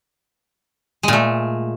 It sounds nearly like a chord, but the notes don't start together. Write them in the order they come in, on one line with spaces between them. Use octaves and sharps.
G#3 A#2 A3